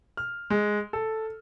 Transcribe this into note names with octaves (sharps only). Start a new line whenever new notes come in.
F6
G#3
A4